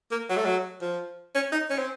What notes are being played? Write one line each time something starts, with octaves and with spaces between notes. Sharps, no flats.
A#3
F#3
A3
F#3
F3
C#4
D#4
C#4
C4